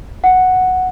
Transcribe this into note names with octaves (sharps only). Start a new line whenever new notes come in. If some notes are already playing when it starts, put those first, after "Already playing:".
F#5